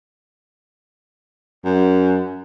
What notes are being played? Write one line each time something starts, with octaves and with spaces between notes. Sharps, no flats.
F#2